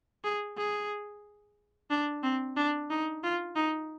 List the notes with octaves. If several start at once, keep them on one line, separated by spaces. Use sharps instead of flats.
G#4
G#4
D4
C4
D4
D#4
F4
D#4